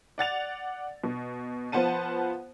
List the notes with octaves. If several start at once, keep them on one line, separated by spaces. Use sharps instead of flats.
D5 F#5 A6 F7
B2
F3 B3 C5 F#5 A5 D#7